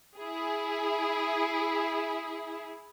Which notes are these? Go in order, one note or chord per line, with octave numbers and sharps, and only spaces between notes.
E4 G#4